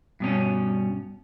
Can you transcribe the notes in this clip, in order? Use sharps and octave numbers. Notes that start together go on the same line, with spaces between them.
G2 B2 C#4